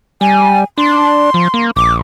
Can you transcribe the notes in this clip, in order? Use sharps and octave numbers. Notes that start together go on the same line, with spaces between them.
G3 G#5
D4 C6
F3
A#3
A#1 D6